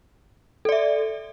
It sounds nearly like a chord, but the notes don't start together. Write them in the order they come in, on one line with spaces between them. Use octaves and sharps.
A4 D5 E5